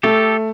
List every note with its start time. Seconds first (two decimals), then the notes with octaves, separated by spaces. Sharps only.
0.03 A3 G4 A4